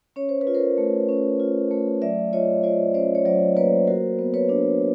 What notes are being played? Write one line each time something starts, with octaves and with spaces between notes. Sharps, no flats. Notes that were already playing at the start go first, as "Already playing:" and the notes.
C#4 C#5
C5
B4
F4
A#4 C5
A3
C#4
F4
A3
F#3 D5 E5
F4 C#5 D#5
F4 C5 D5
C#4 C5 D5
C#5
F#3 C5 D5
A#3 B4 C#5
F#4 A#4 C5
B3
B4 C#5
D4